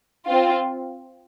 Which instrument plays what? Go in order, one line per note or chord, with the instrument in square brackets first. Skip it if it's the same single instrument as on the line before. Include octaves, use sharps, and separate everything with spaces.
[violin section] C4 F4